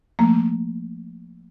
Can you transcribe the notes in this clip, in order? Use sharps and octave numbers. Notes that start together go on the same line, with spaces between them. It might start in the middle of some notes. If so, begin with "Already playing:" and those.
F3 A3 A#3